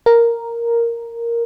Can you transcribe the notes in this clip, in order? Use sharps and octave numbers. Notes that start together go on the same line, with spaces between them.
A#4